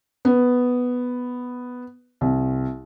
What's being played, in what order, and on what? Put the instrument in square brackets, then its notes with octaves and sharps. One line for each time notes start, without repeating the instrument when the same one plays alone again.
[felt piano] B3
C2